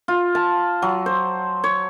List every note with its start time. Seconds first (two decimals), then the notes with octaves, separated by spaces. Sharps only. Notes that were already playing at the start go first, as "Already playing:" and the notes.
0.08 F4
0.35 A5
0.82 F#3
1.06 C5
1.64 C#5